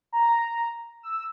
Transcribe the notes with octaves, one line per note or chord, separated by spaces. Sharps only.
A#5
E6